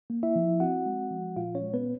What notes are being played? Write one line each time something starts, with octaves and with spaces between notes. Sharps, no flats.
A#3
E4 E5
F3
C4 F#4 F#5
G#3
F3
A#2 F4 F5
C#4 C#5
G#3
B3 B4